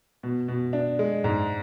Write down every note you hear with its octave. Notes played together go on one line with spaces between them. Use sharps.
B2
B2
D4
G#3
G#2